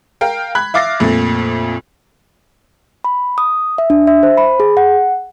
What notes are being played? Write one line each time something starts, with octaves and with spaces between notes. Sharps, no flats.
A#4 F5 G5
B5 F#6 G#6
E5 F5 D6 A6 A#6 C7
F2 A#2 A3
B5
D#6
E5
D4
E5
C5
B5
G#4
F#5